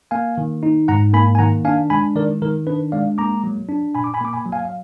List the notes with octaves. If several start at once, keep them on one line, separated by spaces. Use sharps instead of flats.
A#3 F5 G#5
D#3
D#4
G#2 F#5 A#5
A#3 G#5 B5
G#5
D#3 F#5 A#5
D4 F5 G#5
G#3 G#5 B5
D#3 A#4 D5
D#3 A#4
D4 B4
G#3 D5 F5
A#3 A#5 D6
F#3
D4
A#2 G#5 B5
D6
G#5 B5
A#3 D6
G#5 B5
F#3
F5 G#5
F5